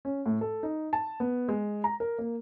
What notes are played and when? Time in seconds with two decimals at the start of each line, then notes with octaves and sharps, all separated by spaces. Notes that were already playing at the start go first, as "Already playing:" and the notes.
0.05 C#4
0.26 A2
0.41 A4
0.63 D#4
0.93 A5
1.20 B3
1.48 G#3
1.84 A#5
2.00 A#4
2.19 A#3